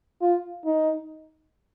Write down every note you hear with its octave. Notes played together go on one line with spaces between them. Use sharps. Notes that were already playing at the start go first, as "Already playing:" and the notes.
F4
D#4